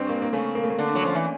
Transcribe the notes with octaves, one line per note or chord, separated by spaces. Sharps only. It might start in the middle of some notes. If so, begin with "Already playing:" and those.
Already playing: G2 C4
A#3
A#3
C#3 A3
A#3
A3
A#3
D3
F#3
F3 C#4
E3